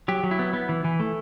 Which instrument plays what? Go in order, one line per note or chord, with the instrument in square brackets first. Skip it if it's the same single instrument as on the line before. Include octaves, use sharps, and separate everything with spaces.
[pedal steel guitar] F#3 G4
F#3
E4
B3
B3
E3
E3
A3